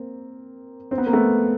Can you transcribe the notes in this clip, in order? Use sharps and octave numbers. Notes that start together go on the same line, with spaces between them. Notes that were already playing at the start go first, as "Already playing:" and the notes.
Already playing: A#3 C4
C4
B3
A#3
A3 B3